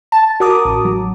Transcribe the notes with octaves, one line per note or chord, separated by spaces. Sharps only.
A5
F#4 A#4 D6 D#6
A1
F#3